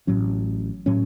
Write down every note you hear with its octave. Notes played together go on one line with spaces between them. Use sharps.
A1 A2 F#3 C#4
A2 F#3 C#4